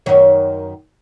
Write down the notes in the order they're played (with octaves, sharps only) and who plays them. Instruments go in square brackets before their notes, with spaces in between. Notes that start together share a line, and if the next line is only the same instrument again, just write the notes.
[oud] F#2 D#3 C#5